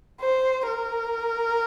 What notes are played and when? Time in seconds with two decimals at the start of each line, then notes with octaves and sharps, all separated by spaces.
0.20 C5
0.68 A#4